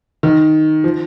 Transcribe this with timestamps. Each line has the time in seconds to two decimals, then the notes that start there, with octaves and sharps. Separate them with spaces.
0.23 D#3
0.84 F3